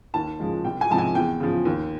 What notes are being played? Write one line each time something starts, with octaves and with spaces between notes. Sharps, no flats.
D#2 A5
C#3 F3 G#3
C2 G5
G#5
C3 F3 G#3 A5
G#5
E2 G5
C#3 F3
D#2